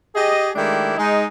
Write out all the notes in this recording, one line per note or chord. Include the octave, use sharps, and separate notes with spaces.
G4 G#4 D#5
D#3 G#3 A3 D4 E4 G4
G#3 D#4